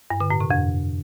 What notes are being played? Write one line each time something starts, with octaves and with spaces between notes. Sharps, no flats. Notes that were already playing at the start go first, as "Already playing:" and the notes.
G2
D3
A2
C3
F2